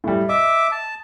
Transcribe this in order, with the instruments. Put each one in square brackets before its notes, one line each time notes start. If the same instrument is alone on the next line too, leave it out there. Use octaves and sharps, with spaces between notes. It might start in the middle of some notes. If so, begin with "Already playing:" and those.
[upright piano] A2 G3
[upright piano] D#5 [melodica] E5 D6
[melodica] A5